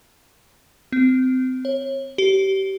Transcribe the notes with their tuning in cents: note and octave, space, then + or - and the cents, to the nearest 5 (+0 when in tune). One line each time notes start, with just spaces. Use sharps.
C4 -25
C#5 -30
G4 -25